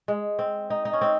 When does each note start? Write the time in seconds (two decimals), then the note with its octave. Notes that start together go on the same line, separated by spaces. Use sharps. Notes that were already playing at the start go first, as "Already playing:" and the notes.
0.08 G#3
0.39 C4
0.70 D#4
0.85 D#4
0.93 C#4
1.01 C4